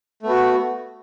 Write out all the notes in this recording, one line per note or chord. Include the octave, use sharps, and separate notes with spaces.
A3 B3 F#4